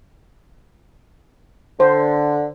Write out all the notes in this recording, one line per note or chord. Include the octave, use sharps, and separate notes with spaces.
D3 C5